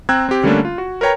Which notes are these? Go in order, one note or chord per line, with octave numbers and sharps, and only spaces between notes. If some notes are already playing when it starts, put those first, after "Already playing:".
C4 G5 A#5 E6 F#6 G#6
C4 G4
D3 G3 A3 A#3 C#4 D4
F4
F#4
A#4 B4 C#5 G5 A#5